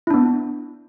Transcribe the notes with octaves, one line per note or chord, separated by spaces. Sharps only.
B3 D4 E4